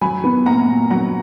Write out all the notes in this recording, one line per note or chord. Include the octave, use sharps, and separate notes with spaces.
F#3 G#5 B5
B3
A#2 F#5 A#5
A#2
F#3 F#5 A#5